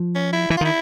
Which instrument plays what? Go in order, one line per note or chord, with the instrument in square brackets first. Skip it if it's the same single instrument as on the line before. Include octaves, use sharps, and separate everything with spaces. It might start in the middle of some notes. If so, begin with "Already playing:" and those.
Already playing: [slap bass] F3
[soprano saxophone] C#4
E4
[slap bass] E3 [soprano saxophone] E4
[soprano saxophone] F4
[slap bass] D#3
[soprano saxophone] E4